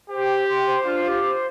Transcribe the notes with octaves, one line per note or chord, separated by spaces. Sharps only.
G4 C5
G5
C6
C5
D4 F4
G4
C5